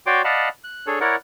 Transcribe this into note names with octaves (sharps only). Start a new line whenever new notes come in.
F#4 C#5 D5 G5 C6 D6
D5 D#5 F5 F#5 A5 B5
F#6
D4 G#4 A4 C#5
E4 A#4 C#5 D5 F#5